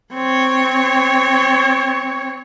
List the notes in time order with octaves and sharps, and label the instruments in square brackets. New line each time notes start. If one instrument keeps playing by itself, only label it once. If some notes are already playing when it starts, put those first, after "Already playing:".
[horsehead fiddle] C4 C#5